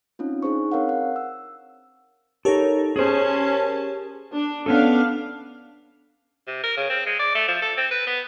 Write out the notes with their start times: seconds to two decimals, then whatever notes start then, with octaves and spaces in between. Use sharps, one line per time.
0.19 C4 C#4 D#4 F4
0.43 D4 D#4 G#4 C5 C#6
0.72 C4 A#4 C#5 F5 F#5
0.89 F#5
1.16 E6
2.45 D#4 G4 A4 A#4 C#5
2.96 C#4 G#4 C5 A5
4.34 D4
4.66 B3 C#4 D4 A4 F5
6.47 C3
6.64 A#4
6.77 C#3
6.89 C4
7.06 G#3
7.19 D5
7.35 A3
7.48 F3
7.62 A4
7.77 C4
7.91 B4
8.07 B3